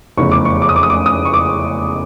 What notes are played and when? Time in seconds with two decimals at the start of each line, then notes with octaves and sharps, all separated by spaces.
0.17 F1 E2 C#3 C#6
0.32 D6
0.45 C#6
0.62 D6
0.69 D#6
0.76 D6
0.83 D#6
0.90 D6
1.06 D#6
1.25 C#6
1.34 D6